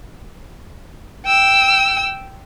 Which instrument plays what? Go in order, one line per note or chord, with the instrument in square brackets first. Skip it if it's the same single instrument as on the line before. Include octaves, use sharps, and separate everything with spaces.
[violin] G5 E6